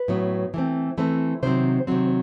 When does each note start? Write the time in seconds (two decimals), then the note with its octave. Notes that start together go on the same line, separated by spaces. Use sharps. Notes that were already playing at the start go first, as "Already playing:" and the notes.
Already playing: B4
0.08 A2 F#3 B3
0.54 E3 A3 C4
0.98 E3 A3 C4
1.43 C3 D#3 F#3 C4 C5
1.87 C3 D#3 F#3 C4